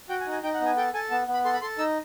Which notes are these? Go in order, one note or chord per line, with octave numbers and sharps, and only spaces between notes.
F#4 G5
G#5
D#4
G#5
D#4 G5
F#5
B3 G#5
A4 G5
A4 G#5
B3 A5
B3
B5
A4 C6
B5
A4 C6
D#4 E6